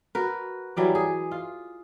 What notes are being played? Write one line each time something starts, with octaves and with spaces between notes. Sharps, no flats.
F#4 A#4 B4
E3 F#3 G3 D5
G#4
F4